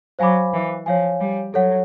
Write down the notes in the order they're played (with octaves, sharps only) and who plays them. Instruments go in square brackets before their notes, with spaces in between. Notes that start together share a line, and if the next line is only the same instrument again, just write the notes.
[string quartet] F#3 [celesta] C5 F5 G#5 B5 D6
[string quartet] E3
[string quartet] F3 [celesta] C#5 F5 G#5
[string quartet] G3
[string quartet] F#3 [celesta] A4 C#5 F#5